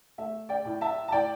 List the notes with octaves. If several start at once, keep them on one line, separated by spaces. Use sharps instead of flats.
A3 E5
D5 G5
A2
E5 A5
A5
A2 D5 G5